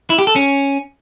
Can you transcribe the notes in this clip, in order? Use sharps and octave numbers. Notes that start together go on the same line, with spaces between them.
E4
G4
A4
C#4